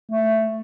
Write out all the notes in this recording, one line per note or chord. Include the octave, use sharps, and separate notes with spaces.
A3